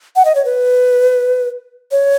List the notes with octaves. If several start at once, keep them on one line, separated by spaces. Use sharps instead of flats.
F#5
D#5
C#5
B4
C#5